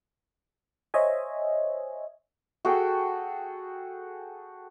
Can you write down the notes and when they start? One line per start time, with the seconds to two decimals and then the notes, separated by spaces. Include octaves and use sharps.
0.94 C5 C#5 D#5 E5 G#5
2.65 F#4 G#4 A4 G5